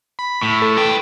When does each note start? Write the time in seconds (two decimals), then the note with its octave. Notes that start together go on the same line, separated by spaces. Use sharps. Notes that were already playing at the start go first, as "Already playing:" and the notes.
0.19 B5
0.43 A2
0.62 A4
0.77 B4 G5